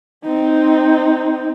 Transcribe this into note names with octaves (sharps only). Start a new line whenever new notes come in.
C4 D#4